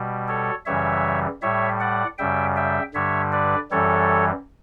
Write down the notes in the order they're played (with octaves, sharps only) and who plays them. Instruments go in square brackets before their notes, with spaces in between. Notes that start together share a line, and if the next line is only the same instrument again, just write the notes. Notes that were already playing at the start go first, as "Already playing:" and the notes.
Already playing: [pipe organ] B2 G3
A4 C#5
F#2 C#3 E3 G3 C#5 E5
A2 G3 C#5 E5
D5 F#5
F#2 C#3 G3 E5 G5
E5 G5
G2 D3 G3 C#5 E5
B4 D5
F#2 E3 G3 A4 C#5